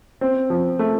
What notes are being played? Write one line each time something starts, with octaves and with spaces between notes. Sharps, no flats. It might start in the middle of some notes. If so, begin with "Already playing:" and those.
C4
F3
A3